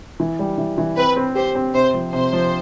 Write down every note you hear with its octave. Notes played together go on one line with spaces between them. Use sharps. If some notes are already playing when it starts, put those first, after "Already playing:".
E3
G3
E3
E3
C4 B4
C4
G4 C5
C4
C3 C5
F3
C3 C5
F3